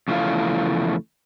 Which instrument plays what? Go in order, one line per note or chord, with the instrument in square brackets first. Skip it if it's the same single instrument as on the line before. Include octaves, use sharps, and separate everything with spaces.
[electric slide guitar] E2 C#3 F3 A3 E4 F5